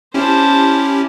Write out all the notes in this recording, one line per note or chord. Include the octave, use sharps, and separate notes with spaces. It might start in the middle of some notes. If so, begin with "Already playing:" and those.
C#4 E4 G4 C5 A5